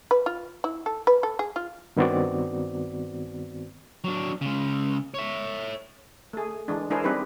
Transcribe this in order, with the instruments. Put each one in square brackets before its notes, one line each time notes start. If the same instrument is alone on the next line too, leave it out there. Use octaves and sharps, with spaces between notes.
[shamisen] B4
F4
E4
A4
B4
A4
G#4
F4
[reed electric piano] G2 D#3 B3 C4 F#4 D5
[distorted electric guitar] F#3 D4
C#3 G#3
C#5 E5
[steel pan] A3 G#4
E3 G#3 D4
G#3 D4 E4 G#4 A#4 C5
G3 C4 D#4 G4 B4